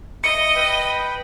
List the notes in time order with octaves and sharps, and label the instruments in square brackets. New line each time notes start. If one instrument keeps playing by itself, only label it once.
[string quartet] D#5 [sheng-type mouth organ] E5 [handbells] C#7
[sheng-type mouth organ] B4 G5 B5